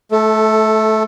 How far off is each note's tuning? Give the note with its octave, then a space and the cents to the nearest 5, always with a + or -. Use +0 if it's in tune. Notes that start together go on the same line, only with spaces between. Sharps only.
A3 -20 A4 +5